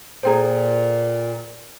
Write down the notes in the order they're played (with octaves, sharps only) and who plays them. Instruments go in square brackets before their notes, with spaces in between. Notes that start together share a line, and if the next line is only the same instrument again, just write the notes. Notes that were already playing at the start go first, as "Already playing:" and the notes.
[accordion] A#2 [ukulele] G#4 C5 [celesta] A4 G5 A#5